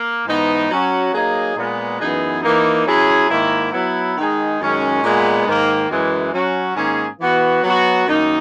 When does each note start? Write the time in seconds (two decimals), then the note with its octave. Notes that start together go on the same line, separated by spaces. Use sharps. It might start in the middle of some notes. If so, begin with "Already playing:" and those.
Already playing: A#3
0.27 G#2 E3 B3 D#4
0.71 F#3 C#4 F#4
1.14 F#3 A#3 D#4 G#4
1.57 A#2 G#3 B3
2.01 F#2 E3 B3 D#4 G#4
2.43 E3 A#3 D#4
2.87 F#3 C#4 E4 G#4
3.30 G#2 D#3 A#3 E4
3.73 F#3 B3 E4
4.17 D#3 G#3 D#4 G#4
4.61 F#2 D#3 G#3 C#4
5.03 A#2 G#3 B3
5.47 G#2 D#3 A#3
5.90 F#2 E3 G#3
6.33 F#3 C#4 F#4
6.76 G#2 D#3 A#3 C#4 G#4
7.21 E3 B3 F#4
7.63 F#3 B3 F#4
8.06 F#2 D#3 A#3 D#4